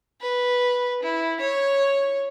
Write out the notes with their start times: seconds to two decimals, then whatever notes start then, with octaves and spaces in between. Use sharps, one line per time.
0.21 B4
1.03 E4
1.40 C#5